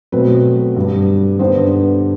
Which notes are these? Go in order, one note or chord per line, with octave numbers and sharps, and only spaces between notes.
B2 F#3 A3 C4 B4
G2 D3 G3
G2 D3 G3 B3 C5